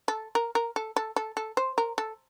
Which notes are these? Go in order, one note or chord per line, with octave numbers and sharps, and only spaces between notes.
A4
A#4
A#4
A4
A4
A4
A4
C5
A#4
A4